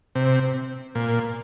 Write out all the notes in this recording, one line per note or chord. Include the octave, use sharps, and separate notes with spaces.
C3
A#2